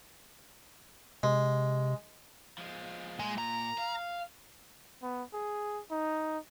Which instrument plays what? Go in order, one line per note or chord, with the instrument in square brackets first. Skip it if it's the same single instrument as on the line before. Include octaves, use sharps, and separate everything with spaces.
[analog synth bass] C3 [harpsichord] G#3
[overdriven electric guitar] F3 G#3
[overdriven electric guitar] A#2 [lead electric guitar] G#3
[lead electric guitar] A#5
[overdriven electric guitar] F5
[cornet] B3
G#4
D#4